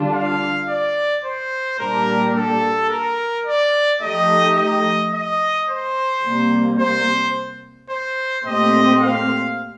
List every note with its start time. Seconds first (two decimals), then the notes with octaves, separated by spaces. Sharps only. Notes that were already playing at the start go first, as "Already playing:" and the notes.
Already playing: D3 G3 D4 F4
0.13 F5
0.68 D5
1.24 C5
1.79 A#2 G3 A#3 D4 G4 A#4
2.35 A4
2.90 A#4
3.45 D5
4.01 F3 A3 D#4 G4 D#5
4.56 D#5
5.13 D#5
5.68 C5
6.24 C3 G3 A#3
6.79 C5
7.89 C5
8.45 A#2 A3 C4 G4 D#5
9.01 F5